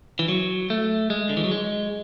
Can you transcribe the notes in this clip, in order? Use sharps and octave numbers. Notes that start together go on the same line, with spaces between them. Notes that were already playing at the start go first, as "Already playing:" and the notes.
E3
F#3
A3
G#3
D3
E3
F#3
G#3